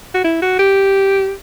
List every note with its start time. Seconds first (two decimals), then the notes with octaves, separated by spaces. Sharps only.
0.14 F#4
0.24 E4
0.42 F#4
0.59 G4